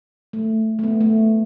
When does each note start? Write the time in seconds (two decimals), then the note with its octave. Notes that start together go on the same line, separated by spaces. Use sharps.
0.33 A3
0.79 A3
0.84 B3
1.01 A3